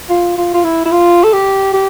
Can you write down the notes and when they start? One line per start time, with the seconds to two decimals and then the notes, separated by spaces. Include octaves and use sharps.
0.09 F4
0.37 F4
0.54 F4
0.64 E4
0.85 E4
0.91 F4
1.24 A4
1.33 G4
1.73 G4